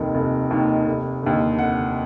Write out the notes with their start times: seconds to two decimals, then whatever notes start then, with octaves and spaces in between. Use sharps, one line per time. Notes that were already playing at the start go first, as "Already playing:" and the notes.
Already playing: F1 D#2 D#3
0.15 F1
0.51 D#2 D#3
0.86 F1
1.23 D#2 D3
1.59 F1 F#5